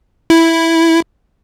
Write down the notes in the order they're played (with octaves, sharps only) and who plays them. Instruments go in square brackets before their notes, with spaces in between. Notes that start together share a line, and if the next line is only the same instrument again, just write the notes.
[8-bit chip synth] E4